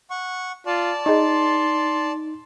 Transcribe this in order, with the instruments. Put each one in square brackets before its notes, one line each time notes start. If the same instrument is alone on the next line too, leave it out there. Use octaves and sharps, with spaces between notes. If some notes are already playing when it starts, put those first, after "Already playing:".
[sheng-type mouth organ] F#5 C#6
[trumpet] F4 [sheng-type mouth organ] D5 A5
[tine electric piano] D#4 [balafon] G#4 D#5 [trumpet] C6